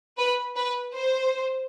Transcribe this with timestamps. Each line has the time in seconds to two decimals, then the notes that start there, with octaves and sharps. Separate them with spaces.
0.18 B4
0.56 B4
0.94 C5